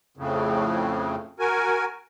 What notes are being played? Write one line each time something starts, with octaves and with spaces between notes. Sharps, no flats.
F2 A2 C#3
F#4 A#4 G#5